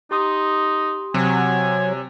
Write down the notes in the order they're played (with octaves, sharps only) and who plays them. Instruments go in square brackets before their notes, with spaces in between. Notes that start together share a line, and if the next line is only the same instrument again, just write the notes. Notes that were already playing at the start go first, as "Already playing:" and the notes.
[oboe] D#4 [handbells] G4 C6 D#6
[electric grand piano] C3 [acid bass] F#3 [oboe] G#5